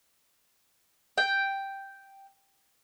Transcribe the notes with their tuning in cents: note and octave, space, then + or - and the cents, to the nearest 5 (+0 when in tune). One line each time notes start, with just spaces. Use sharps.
G5 +0